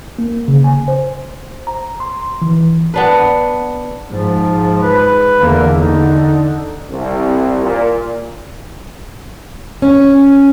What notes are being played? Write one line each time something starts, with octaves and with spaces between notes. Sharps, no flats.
A#3
C#3
G#5
C5
A#5
C6
E3
B3 D4 B4
G#2 F3
B4
E2 D3 A#3
D3 D#4
C2
A#2
C#4